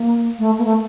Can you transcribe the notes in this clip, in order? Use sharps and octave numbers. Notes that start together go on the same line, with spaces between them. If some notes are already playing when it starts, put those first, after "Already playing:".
Already playing: A#3
A3
A#3
A3